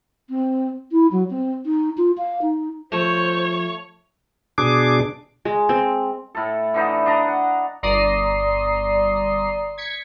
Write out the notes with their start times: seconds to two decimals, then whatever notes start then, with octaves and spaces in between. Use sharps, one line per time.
0.30 C4
0.92 E4
1.12 F#3
1.30 C4
1.66 D#4
1.98 F4
2.18 F5
2.42 D#4
2.92 F3 A3 C5 C#5
4.58 B2 D4 G#4 D6
5.45 G#3
5.69 C4
6.35 A2 A4
6.74 D3 E3 D#4
7.06 D4 D#5 A#5
7.28 F#5
7.83 G1 D5 A#5 C6 D#6 C7
9.78 G#6 B6 C#7